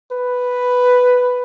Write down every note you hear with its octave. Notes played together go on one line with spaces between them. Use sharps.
B4